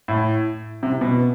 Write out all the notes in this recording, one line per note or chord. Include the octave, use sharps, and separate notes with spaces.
A2
C3
B2